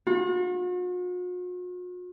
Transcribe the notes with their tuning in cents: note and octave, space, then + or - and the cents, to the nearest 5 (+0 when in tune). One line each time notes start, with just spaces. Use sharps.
F#4 -45